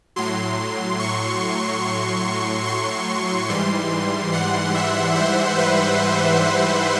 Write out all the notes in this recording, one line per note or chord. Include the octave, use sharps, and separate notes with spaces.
A2 F#3 C6
C#6
C6
G#2 E3 G3 C6
F#5
E5
C5
B4